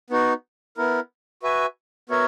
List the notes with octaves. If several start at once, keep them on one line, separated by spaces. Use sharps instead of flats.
B3 D#4 F#4
B3 E4 A#4
F#4 B4 E5 G#5
B3 F#4 A#4 C#5 E5